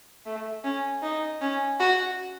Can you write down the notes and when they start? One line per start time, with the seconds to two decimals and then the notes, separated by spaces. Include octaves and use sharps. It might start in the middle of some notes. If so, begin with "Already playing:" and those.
0.26 A3
0.64 C#4
1.03 D#4
1.41 C#4
1.80 F#4